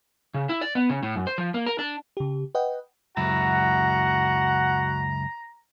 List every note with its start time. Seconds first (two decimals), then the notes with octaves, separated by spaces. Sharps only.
0.34 C#3
0.49 E4
0.61 D5
0.75 B3
0.89 C#3
1.03 A2
1.16 F#2
1.27 C5
1.38 F3
1.54 A#3
1.66 A#4
1.79 D4
2.17 C#3 G4
2.55 B4 D#5 F#5 G5
3.17 C#2 F#2 E4 F#4 F#5 A#5